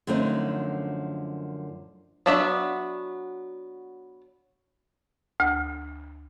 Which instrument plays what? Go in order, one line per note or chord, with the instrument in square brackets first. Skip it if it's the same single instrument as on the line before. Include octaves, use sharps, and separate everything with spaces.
[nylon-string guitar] F#2 D3 F3 A3 C4 D#4
[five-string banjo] F#3 B3 D4 F#4 E5
[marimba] D2